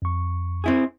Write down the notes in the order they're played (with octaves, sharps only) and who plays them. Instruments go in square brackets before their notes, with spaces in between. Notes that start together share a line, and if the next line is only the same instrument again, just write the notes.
[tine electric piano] F2 C#6
[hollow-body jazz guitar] C4 E4 G#4